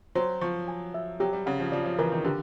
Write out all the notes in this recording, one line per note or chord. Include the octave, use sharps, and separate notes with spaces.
F#3 C5
F3 C#6
G#5
E5
F#3 G4
G3
C#3 F#5
F3
F3 D5
F3
E3 A#4
D#3
D3 G4